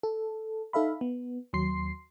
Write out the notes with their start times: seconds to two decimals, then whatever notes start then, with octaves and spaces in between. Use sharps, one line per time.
0.03 A4
0.73 D#4 A4 E5 F5 B5
1.01 B3
1.53 D#2 F#3 C6 C7